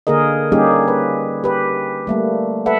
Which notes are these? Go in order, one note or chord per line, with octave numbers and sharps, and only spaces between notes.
D3 A#3 G#4 A#4 D#5
G3 A#3 C#4 D#4 G4 G#4
B4
G4 B4
G3 A3 A#3
A4 B4 E5 F#5